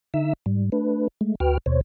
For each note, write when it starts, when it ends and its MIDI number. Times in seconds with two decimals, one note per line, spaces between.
0.14 0.33 50
0.14 0.33 63
0.14 0.33 76
0.14 0.33 88
0.46 0.70 44
0.46 0.70 55
0.72 1.08 57
0.72 1.08 62
0.72 1.08 71
1.21 1.35 56
1.21 1.35 57
1.40 1.58 38
1.40 1.58 66
1.40 1.58 71
1.40 1.58 79
1.40 1.58 89
1.66 1.81 39
1.66 1.81 47
1.66 1.81 72
1.66 1.81 73